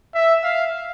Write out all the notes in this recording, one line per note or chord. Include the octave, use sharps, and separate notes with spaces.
E5
F5